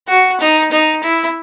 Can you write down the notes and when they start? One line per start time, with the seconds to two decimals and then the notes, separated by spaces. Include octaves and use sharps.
0.08 F#4
0.40 D#4
0.72 D#4
1.03 E4